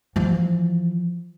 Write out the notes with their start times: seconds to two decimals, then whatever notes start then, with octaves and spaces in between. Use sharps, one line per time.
0.16 E3 F3